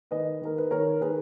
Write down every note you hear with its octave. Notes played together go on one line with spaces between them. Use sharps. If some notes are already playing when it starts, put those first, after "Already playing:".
D#3 B4 D#5
D#3 A#4
B4
D#3 A#4 C#5
D#3 G#4 B4